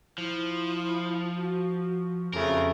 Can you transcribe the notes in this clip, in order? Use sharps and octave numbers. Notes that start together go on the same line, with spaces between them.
F3 E4
F#4
F2 C#3 A3 A#4